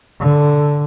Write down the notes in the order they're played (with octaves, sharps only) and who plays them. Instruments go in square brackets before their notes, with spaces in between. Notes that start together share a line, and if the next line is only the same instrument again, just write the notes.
[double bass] D3